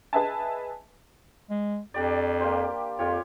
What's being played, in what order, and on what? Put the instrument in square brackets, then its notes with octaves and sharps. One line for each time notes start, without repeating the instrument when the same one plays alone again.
[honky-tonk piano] G#4 B4 D#5 E5 G#5 A5
[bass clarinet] G#3
[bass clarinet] F2 [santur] D4 G4 D5
[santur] A#3 G4 C5
[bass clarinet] F2 [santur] F4 G4 C#5